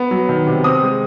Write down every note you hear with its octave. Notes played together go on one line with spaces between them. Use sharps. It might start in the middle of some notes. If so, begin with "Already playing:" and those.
Already playing: B3
F#3
D#3
C3
C4 D#6
G#3